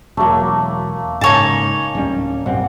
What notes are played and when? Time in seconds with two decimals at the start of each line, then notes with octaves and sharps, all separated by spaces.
0.17 E1 F#3 A3 A#3
1.21 G#2 C#3 A#3 D#4 C#5 G#5 A5
1.95 D1 G3 C#4
2.46 B1 G2 C4 F#5